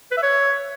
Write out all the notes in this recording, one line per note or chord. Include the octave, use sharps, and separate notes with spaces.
B4
E5
C#5